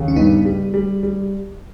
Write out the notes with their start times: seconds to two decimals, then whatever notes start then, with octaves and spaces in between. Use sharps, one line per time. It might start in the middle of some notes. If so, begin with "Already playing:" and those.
Already playing: D#2 C#3
0.08 C#4
0.16 G2 B3 D#4
0.45 G3
0.74 G3
1.03 G3